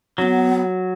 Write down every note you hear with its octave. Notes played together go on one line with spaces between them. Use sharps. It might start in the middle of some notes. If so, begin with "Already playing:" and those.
F#3 B3 C#4